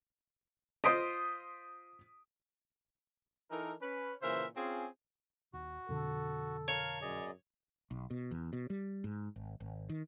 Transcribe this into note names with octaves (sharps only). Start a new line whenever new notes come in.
F4 C5 D#5 D#6 B6 D7
E3 D#4 A4 A#4
C#4 B4
A#2 C#3 E3 A#4 C5 E5
C4 C#4 F4 G#4
D#1 F#4
F2 B2 D3 A4
A#4 C#5 F5 A5
F#2 G#4 D5 D#5
B1
B2
E2
B2
G3
G#2
G#1
G#1
D#3